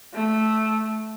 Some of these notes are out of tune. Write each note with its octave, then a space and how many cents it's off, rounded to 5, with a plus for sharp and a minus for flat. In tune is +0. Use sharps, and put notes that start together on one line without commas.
A3 -10